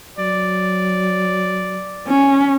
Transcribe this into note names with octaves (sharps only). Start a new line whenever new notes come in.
F#3 D5
C#4